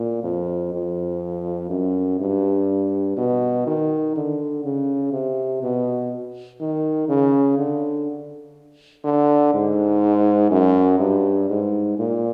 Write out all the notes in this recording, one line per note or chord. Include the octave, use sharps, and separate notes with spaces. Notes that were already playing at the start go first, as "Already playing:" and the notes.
Already playing: A#2
F2
F2
F#2
G2
B2
D#3
D3
C#3
C3
B2
D#3
C#3
D3
D3
G#2
F#2
G2
G#2
A#2